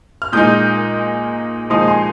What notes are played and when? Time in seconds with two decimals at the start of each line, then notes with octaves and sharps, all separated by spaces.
0.22 F6
0.32 A#2 G#3 D#4 D#6 G6
1.70 A#2 F3 G#3 D#4 C6 D#6
1.88 G#5 C6